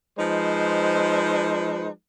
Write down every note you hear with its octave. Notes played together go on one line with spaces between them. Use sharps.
F3 G#3 D#4 B4 C5